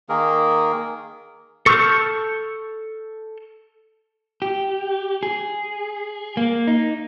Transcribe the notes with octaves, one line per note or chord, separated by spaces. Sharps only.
D#3 A#3 G#4 A#4
A4 C#6 E6 F6 G6
G4
G#4
A#3
D#4